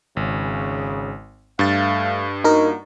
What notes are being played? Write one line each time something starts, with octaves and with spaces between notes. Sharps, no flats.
G#1 C#3
G2 A3 F5 A6
A#3 D#4 F4 F#4 A#4